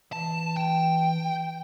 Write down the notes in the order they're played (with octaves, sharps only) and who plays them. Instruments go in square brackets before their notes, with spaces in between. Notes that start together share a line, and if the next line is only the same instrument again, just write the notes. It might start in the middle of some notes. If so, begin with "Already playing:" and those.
[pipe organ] E3 [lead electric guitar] A5
[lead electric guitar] G5